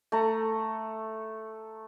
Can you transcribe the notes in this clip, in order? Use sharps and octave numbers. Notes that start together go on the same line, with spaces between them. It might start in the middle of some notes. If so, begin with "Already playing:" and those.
A3 A#5